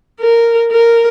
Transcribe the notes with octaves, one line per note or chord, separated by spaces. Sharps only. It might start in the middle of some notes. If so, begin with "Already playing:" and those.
A#4
A#4